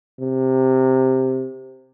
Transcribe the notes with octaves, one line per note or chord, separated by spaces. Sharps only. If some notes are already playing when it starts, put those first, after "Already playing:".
C3